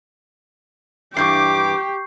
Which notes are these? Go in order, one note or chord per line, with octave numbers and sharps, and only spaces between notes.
G2 E3 G4 C#6 D6 G6 C7